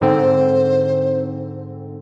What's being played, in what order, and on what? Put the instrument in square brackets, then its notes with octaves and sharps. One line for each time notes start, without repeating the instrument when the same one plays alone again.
[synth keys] G#2 D3 C4 [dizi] C5